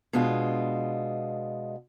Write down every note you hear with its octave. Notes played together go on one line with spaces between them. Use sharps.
B2 G#3 D4 F4